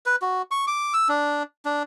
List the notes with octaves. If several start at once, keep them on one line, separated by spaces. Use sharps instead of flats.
B4
F#4
C#6
D6
E6
D4
D4